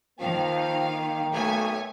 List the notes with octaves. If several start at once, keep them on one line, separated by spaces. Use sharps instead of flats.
D#3 F3 A#3 F5 G5
B1 A3 C#5 G#5